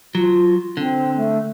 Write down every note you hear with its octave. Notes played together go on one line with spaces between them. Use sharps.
F#3 F4
D3 C4
A3